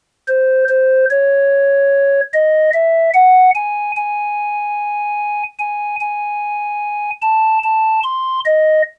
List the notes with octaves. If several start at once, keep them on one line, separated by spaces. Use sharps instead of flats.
C5
C5
C#5
D#5
E5
F#5
G#5
G#5
G#5
G#5
A5
A5
C6
D#5